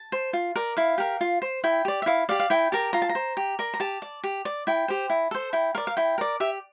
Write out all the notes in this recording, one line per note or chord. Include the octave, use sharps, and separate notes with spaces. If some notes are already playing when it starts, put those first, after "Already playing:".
Already playing: A5
C5
F4
A#4 D5
E4 F5
G4 A#4
F4
C5
E4 G5
G4 D5
E5
E4 F5
G4 D5 F5
F5
E4 G5
G4 A#4 A5
F4 A#5
A5
A#5
C5
G4
A#4 D5
A#5
G4 A5
D5
G4
D5
E4 G5
G4 C5
E4
A4 C5
E4 G5
A#4 D5 F5
F5
E4 G5
A#4 D5
G4 E5